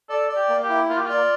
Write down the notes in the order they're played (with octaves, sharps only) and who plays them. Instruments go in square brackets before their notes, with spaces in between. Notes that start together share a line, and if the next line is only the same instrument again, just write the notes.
[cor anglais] A4 [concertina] D5
[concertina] D5
[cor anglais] G4
[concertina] A#3
[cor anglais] G4
[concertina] E4
[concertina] A#3 [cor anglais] F4
[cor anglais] G4
[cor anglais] F4 [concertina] D5